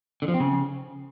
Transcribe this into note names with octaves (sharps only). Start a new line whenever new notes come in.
D3
F3
C4
C#3